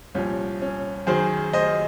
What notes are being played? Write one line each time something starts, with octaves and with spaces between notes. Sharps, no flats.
C2 A#2 F3 C#4
C#4
F#2 D#3 F#3 G#4 C5
C5 D#5